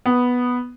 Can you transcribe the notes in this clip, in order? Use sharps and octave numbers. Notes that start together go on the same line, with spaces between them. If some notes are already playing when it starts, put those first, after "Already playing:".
B3